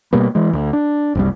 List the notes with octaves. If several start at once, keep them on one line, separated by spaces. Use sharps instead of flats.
B2 G3 A#3 B3
E3 G#3
D2
D4
F#1 C2 G3